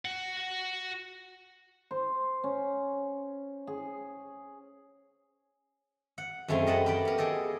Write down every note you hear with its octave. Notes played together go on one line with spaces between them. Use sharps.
F#4 F#5
C5
C#4
G#4
F#5
F#2 G#3 A3 C4 F5 G#5
A#4 D#5 F#5 A5 B5
G4 A#4 B4 D5 G5
B3 A#4
G#4 A4 D#5 G5